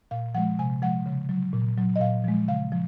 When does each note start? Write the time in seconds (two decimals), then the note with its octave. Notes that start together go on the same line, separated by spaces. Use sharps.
0.11 A#2 F5
0.35 F3 G#3 F#5
0.59 C3 G#5
0.82 F3 G#3 F#5
1.06 C#3
1.29 F#3
1.53 A#2
1.78 F#3
1.96 D#5
2.00 A#2 F5
2.24 F3 G#3
2.48 C#3 F5
2.72 F3